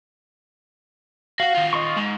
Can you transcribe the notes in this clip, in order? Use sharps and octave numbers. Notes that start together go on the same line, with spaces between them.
F#4 F5 F#5
D#3 F4
D#5 C6 C#6
G#2